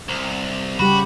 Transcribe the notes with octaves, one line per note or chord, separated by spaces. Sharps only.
C2
C#3 G3 F#4 G4 B5